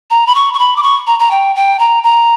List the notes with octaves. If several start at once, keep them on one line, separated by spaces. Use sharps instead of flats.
A#5
B5
C#6
C#6
B5
D6
C#6
A#5
A#5
G5
G5
A#5
A#5